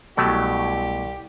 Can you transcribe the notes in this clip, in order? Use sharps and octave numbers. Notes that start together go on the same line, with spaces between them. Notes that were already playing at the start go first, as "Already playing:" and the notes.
C2 B2 F#3 A3 G4